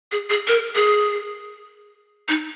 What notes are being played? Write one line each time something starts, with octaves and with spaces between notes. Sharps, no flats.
G#4
G#4
A#4
G#4
D#4